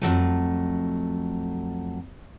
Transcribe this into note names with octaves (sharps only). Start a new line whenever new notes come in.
F2 E3 F#3 A3